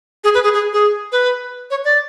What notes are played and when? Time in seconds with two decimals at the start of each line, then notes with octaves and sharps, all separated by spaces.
0.24 G#4
0.34 B4
0.44 G#4
0.54 G#4
0.73 G#4
1.12 B4
1.71 C#5
1.84 D5